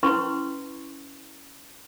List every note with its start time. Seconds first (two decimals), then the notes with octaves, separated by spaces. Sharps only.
0.03 C#4 E4 B4 C6 C#6